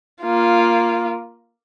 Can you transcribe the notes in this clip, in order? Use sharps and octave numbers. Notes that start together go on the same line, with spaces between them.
A#3 F4